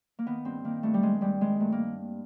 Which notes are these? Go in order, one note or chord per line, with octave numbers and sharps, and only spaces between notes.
A#3
D#3 B3
G2 C4
D#3 A#3
G2 A3
G3
D#3 G#3
G2 G3
D#3 G#3
G2 A3
A#3